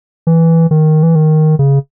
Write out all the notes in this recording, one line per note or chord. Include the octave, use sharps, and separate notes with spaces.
E3
D#3
E3
D#3
C#3